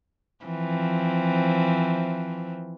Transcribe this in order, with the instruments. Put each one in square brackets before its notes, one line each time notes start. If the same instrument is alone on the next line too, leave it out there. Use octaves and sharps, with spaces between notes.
[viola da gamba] E3 F3 C4